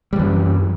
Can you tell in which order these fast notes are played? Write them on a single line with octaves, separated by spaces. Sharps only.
G3 E3 F#2